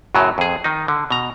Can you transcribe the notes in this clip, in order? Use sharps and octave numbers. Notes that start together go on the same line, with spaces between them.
F#2 A2 C#3 F#3
F2 G#4
D#3 D#4
D3
B2 A#5